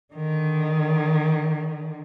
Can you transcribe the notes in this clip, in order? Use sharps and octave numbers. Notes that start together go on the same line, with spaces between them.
D3 D#3